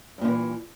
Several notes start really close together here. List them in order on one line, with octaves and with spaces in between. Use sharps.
G2 A#2 D3 E3